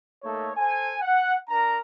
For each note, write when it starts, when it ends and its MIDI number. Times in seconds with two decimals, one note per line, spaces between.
0.24 0.51 57
0.24 0.51 58
0.24 0.51 63
0.24 0.51 69
0.24 0.51 73
0.57 0.96 69
0.57 0.96 72
0.57 0.96 80
1.02 1.34 78
1.50 1.78 62
1.50 1.78 70
1.50 1.78 82